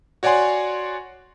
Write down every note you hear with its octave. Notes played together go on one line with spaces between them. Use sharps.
F#4 C#5 D5 F#5 G#5 C6